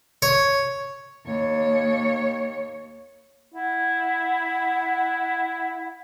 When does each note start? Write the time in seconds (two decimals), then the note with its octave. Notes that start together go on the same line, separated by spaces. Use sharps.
0.22 C#5
1.25 D#2 C#5
3.54 E4 F#5